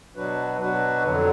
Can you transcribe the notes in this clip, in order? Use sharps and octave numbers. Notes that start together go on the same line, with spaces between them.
B2 F#3 D4 F#4 B4
B2 F#3 D4 F#4 B4
F2 D3 F#3